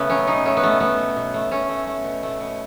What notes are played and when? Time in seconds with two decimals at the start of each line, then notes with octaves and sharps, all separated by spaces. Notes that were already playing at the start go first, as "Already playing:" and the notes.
Already playing: C#3 A3 B3
0.10 F#3 C#4
0.27 B2 D#4
0.45 A3 C#4
0.57 B3
0.63 B2 A3
0.80 A3 B3
0.99 B2
1.17 B2
1.34 A3
1.51 A3 C#4
1.69 A3
1.87 A3
2.04 B2
2.23 A3
2.40 B2